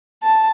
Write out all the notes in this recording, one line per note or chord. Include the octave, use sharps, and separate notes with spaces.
A5